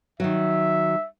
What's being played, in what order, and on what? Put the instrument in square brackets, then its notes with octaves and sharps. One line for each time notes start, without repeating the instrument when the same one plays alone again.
[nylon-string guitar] D#3 F#3 [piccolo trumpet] E5